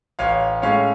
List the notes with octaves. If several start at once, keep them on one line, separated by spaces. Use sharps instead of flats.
A1 C#5 F5
A2 G#3 C#4 C#5 F5